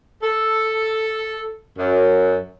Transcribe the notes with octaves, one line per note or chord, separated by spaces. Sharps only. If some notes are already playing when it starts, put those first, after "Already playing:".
A4
F#2